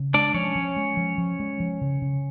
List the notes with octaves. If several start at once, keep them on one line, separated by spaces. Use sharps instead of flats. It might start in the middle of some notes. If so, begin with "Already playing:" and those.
Already playing: C#3
G#3 D4 D5
F3 C#4 C#5
F3
G#3
F3
F3
G#3
F3
C#3
C#3